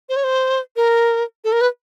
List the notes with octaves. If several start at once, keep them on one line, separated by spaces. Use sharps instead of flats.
C5
C#5
C5
A#4
A4
A#4
B4